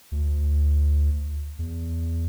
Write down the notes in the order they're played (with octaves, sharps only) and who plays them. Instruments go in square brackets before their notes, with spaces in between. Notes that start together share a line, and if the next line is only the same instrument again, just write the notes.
[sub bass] D2
E2